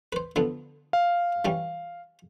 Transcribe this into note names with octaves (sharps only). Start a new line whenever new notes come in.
B4 C5
D3 F3 B3
F5
E3 G3 C#4